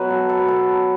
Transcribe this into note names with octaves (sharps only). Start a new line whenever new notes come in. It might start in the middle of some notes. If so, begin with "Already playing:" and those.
Already playing: B2 F#3 B4
A4
A4
B4
A4